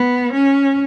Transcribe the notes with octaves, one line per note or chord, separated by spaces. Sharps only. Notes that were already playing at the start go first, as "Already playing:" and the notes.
Already playing: B3
C#4